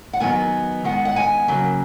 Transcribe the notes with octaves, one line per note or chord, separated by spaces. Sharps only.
F#5
D#3 F#3 B3 G#5
D#3 G#3 B3 F#5
F#5
G#5
C#3 F#3 A#3